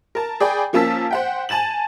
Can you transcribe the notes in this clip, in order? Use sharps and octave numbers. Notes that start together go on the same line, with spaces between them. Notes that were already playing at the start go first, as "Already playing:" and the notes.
A#4 A5
G#4 D5 G5 B5
F3 A#3 C#4 A5 E6 B6
C5 F#5 G5
G#5 A5 A6 E7 F#7